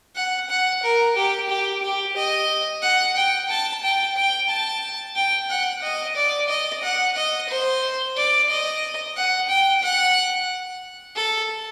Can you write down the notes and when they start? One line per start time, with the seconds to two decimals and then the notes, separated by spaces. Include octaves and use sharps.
0.16 F#5
0.50 F#5
0.83 A#4
1.16 G4
1.49 G4
1.83 G4
2.17 D#5
2.82 F#5
3.17 G5
3.50 A5
3.83 G5
4.17 G5
4.50 A5
5.16 G5
5.50 F#5
5.83 D#5
6.16 D5
6.49 D#5
6.83 F#5
7.16 D#5
7.49 C5
8.17 D5
8.50 D#5
9.17 F#5
9.49 G5
9.83 F#5
11.16 A4